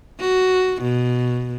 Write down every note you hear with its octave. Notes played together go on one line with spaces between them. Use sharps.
F#4
B2